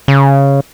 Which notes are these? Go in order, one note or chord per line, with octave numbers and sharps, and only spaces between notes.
C#3